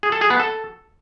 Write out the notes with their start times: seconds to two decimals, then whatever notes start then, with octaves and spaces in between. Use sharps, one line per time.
0.03 G#4
0.12 A4
0.21 G#4
0.30 B3
0.40 A4